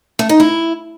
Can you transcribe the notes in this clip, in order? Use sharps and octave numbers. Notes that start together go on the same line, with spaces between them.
A3
D#4
E4